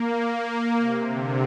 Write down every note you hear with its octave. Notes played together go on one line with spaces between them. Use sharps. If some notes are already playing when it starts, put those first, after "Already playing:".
Already playing: A#3
C3
D3